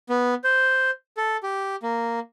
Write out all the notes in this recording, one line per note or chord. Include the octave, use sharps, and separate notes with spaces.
B3
C5
A4
G4
A#3